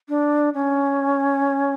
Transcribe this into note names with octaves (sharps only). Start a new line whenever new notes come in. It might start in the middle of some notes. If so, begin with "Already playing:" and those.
D4
C#4